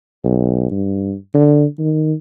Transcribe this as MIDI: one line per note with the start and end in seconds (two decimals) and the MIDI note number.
0.24 0.67 35
0.71 1.14 43
1.34 1.65 50
1.79 2.13 51